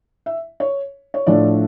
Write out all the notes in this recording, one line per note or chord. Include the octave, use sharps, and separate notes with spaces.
E5
C#5
C#5
A2 F3 A3 D4 D5